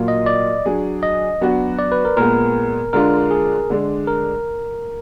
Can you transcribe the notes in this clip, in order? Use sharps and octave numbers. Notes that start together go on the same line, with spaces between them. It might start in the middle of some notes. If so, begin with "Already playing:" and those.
Already playing: A#2 F#3 A#3 F4
D#5
D5
F#3 D4 G#4
D#5
F#3 B3 D4 F#4
D5
B4
A#4
A#2 G#3 B3 A#4
D3 G#3 D4 F4 A#4
G#4
D3 G#3 D4
A#4